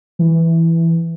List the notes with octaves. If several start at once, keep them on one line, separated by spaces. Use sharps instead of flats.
E3